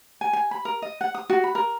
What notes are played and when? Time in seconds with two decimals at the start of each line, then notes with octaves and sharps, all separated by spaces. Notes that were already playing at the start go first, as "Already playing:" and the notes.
0.21 G#5
0.33 G#5
0.51 B5
0.65 A#4
0.82 D#5
1.01 F#5
1.15 D#6
1.30 F#4
1.44 B5
1.55 A#4